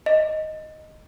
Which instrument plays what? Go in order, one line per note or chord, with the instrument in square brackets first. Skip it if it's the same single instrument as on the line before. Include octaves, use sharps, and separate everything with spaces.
[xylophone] D#5